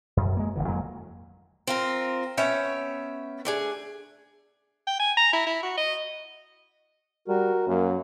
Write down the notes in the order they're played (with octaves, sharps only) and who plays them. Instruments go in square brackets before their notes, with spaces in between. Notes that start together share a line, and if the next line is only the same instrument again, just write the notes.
[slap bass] F#2
G#3 A#3
G#1 D3 E3
F2 F#3 G#3 A#3
[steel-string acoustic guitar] C4 F4 A#4
B3 C#4 C#5 E5 G5
A3 D4 G#4
[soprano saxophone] G5
G#5
A#5
E4
E4
F#4
D#5
[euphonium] G3 [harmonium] F#4 A#4
[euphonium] F#2 [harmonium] A#3